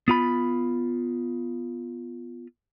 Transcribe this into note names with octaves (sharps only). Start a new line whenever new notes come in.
B3 F4 B5